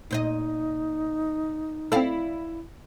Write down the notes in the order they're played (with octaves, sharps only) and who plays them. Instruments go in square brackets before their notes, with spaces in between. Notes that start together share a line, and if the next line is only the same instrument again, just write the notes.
[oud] A#2 C5 D#5 [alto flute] D#4
[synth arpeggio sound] C4 A4 [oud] E4 D5 F5